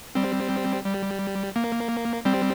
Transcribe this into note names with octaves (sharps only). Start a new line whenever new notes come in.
G3 C4
G3
A#3
G3 C4